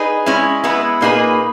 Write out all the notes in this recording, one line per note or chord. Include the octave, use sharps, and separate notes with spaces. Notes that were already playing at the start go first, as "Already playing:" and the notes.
Already playing: D#4 G#4 B4
G#3 C#4 E4
G#3 B3 E4 B4
A#2 A#3 D#4 G#4 B4